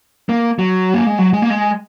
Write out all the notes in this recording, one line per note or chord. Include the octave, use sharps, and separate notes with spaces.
A#3
F#3
A#3
G#3
F#3
G#3
A#3
G#3